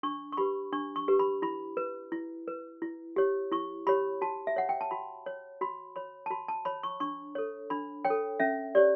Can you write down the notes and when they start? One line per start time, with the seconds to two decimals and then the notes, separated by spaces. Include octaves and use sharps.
0.03 D4 C#6
0.32 C#6
0.37 G4 B4 B5
0.72 D4 C#6
0.96 C#6
1.08 G4 B4
1.19 B5
1.42 E4 B5
1.77 B4
2.12 E4
2.48 B4
2.82 E4
3.16 G4 C#5
3.52 E4 C#6
3.87 G4 C#5 B5
4.21 F#4 A5
4.47 E5
4.56 C#5 F#5
4.69 G5
4.81 A5
4.91 F#4 B5
5.26 C#5
5.61 F#4 B5
5.96 C#5 B5
6.26 A5
6.30 F#4 B5
6.48 A5
6.65 C#5 B5
6.83 C#6
7.00 D4 C#6
7.35 A4 C#5
7.70 D4 B5
8.05 C#5 G5
8.10 A4
8.40 C#4 E5
8.75 G4 C#5 D5